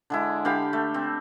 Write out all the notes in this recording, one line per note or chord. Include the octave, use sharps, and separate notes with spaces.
D3 G#3 E4
D3 G4 F5 B5
A3
C4